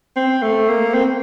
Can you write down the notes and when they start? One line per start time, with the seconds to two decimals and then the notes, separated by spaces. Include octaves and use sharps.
0.16 C4
0.42 A3
0.68 A#3
0.94 C4